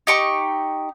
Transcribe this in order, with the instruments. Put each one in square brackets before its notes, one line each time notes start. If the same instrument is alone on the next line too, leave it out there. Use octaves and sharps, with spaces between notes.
[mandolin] D#4 G4 C#6